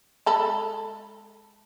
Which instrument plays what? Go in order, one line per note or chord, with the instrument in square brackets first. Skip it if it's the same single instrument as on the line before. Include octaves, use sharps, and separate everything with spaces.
[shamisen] G#3 A4 B5